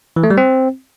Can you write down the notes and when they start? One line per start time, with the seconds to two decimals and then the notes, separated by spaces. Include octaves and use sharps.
0.16 E3
0.23 A3
0.30 G3
0.38 C4